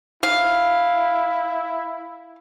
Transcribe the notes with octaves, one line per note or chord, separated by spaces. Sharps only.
E4 F5